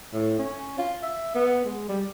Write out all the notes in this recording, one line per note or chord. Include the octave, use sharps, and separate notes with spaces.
A2
C#4
F4
E5
B3
G#3
G3